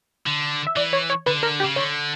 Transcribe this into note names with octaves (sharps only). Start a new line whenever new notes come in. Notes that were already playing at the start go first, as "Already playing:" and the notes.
D3
E5
E3 D5
C#5
C#5
D3 B4
A#4
G4
C#3
D3 C#5